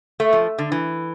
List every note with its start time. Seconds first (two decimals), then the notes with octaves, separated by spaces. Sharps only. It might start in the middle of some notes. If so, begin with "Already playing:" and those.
0.20 A3
0.33 F3
0.59 D3
0.72 E3